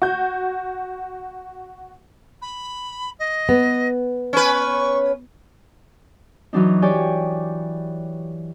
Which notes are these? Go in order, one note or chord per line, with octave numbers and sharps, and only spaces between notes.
F#4 G6
B5
D#5
B3
C#4 B4 C#6
E3 F#3 D4 D#4
G4 C#5 D5 G5 G#5